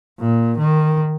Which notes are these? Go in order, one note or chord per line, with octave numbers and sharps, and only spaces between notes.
A#2
D#3